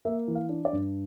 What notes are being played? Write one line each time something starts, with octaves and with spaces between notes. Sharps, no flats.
A#3 E5
E3
F5
D4
D5
G2